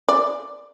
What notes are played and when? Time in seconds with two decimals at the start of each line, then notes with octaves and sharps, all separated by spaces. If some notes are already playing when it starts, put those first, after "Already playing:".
0.09 D5